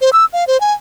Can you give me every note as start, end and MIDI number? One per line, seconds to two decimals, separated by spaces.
0.01 0.10 72
0.13 0.25 88
0.33 0.44 77
0.48 0.60 72
0.61 0.73 80